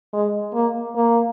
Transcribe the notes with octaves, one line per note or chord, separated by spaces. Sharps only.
G#3
A#3
A#3